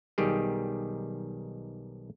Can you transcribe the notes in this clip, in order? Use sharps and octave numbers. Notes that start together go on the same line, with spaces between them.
B1 D#3 G3 G4 G#4